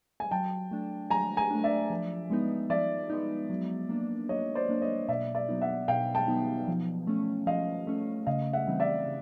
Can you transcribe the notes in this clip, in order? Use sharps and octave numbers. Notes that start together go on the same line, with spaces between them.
G#5
F#3 G5 A5
A3 D4
F#3 G#5 A#5
G#5 A#5
A3 D4
D5 E5
F3
G#3 B3 D#4
F3 D5 E5
G#3 B3 D#4
F#3
A#3 D4
F#3 C#5 D#5
C5 D5
A#3 D4
C#5 D#5
B2 D5 E5
D5 E5
F#3 B3 D#4
E5 F#5
B2 F5 G5
G5 A5
F#3 B3 D#4
F3
A3 C#4
F3 D#5 F5
A3 C#4
C#3 D#5 F5
E5 F#5
E3 G3 C4 D#4
D5 E5
C#3